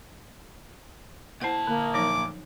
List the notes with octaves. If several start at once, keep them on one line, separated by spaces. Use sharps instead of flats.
A#2 E4 C5 F#5 A5
D3 A#3
F3 F#3 D#4 D6